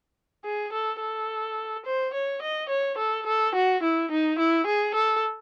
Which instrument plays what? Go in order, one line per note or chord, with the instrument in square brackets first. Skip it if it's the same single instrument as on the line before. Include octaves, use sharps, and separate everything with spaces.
[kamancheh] G#4
A4
A4
C5
C#5
D#5
C#5
A4
A4
F#4
E4
D#4
E4
G#4
A4